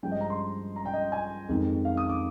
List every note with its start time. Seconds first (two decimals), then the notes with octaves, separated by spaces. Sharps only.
0.03 G2 F3 G#3 G5
0.12 D#5
0.21 A#5
0.30 C6
0.76 A#5
0.86 G5
0.93 D#5
1.12 G#5
1.49 F2 D#3 G#3
1.85 F5
1.97 D#6
2.09 D6